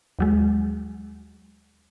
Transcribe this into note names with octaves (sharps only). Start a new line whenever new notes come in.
D#2 F#3 G#3